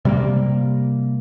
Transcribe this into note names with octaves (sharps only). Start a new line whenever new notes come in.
C3 G3 A3 A#3